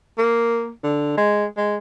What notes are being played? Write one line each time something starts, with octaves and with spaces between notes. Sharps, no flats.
A#3
D3
G#3
G#3